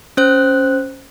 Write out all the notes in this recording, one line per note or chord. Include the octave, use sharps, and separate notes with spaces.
C#4 C5 F#6